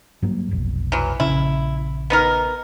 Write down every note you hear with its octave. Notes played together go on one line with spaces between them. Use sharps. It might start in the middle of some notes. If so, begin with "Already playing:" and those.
G2 F#3 A#3
F1 B1
E3 F#3
A#1 C#3 C#4 E4
B3 D#4 A#4